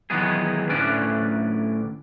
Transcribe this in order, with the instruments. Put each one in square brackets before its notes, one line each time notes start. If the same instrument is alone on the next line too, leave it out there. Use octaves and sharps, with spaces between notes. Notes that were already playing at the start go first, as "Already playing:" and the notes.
[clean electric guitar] D#3 E3 F#3 G#3 B3 G#4
D2 A2 C#4 D4 B4 D5